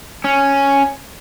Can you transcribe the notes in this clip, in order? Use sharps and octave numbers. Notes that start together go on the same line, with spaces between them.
C#4